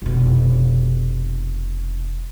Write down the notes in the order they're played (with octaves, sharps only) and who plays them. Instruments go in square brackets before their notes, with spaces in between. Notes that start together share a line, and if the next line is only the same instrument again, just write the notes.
[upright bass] F1 B2